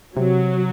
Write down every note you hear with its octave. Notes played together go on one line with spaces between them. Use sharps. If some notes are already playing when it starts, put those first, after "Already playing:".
C3 F#3